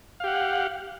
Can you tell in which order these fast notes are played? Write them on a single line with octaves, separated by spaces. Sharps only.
F5 G4 F#5